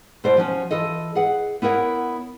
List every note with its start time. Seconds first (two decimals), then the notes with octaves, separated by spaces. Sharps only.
0.24 B2 E4 C5 D5
0.37 F3 F#3 C#4 F#4
0.71 E3 F4 A4 D#5
1.15 G#4 B4 F#5
1.62 B3 E4 A#4 C#5 F#5